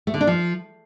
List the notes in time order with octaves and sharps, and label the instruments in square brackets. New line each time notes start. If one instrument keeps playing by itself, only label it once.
[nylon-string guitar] A3
D3
D4
F3